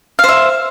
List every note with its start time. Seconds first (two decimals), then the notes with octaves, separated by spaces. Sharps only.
0.19 F5
0.24 C5
0.29 E5